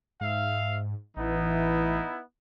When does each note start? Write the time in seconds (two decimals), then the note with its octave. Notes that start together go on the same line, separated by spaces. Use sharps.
0.21 G#2 E5 F5
1.17 A1 E3 B3 D#4 E4